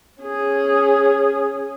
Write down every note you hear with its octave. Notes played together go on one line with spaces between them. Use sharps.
C#4 G#4